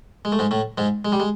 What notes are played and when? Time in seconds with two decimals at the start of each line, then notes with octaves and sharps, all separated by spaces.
0.25 G#3
0.32 A3
0.39 G#2 G#3
0.51 A2 A3
0.78 G#2 G#3
1.05 G#3
1.12 G3
1.20 G#3